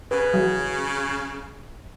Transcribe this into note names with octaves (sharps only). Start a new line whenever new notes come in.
C#3 B4
E3 F#3